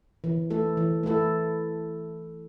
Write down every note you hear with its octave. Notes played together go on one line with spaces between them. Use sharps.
E3
A3 E4 A4
E3
A3 E4 A4